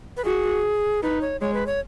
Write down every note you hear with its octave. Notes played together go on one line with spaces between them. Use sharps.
B4
F#4 G#4
D#4 B4
C#5
G#3 C#5
B4
C#5